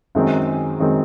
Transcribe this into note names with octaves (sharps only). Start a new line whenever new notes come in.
F#2 D#3 G#3 C4
F#2 D#3 G#3 C4